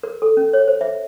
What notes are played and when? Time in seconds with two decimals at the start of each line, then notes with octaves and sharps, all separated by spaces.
0.03 A#4
0.22 A4
0.37 C#4
0.53 C#5
0.68 C5
0.81 E5